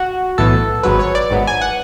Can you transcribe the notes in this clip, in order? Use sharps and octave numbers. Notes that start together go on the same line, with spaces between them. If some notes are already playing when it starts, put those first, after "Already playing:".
Already playing: F#4
B1 A2 E3 B3 A4
G#1 G#2 F#3 B3 B4
C#5
D5
G#1 G#2 F#3 B3
G#5
F#5